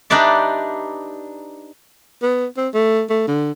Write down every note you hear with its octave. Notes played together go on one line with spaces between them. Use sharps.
D4 D#4 G4 B4 D5 E5
B3
C4
A3
A3
D3